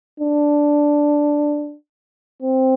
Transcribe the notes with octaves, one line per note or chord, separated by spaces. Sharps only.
D4
C4